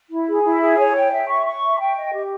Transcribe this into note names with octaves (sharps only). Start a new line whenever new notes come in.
E4
G#4
E4
G#4
C#5
G5
E5
C#6
C#6
E5
G5
D#5
G4